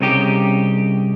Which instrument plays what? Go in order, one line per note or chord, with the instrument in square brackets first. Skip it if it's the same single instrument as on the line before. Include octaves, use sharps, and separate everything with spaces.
[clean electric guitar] C2 C#3 D#4 G4